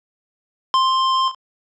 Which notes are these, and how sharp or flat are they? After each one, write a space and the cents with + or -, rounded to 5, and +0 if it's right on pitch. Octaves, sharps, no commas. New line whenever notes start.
C6 +5